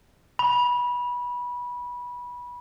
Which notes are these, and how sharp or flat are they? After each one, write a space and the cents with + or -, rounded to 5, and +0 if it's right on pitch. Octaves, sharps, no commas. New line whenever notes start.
B5 -20